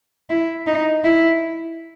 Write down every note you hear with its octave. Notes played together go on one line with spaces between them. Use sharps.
E4
D#4
E4